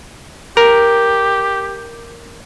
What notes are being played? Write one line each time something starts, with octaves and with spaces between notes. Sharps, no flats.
G4 A#4